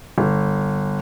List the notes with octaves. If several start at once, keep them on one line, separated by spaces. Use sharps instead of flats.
G1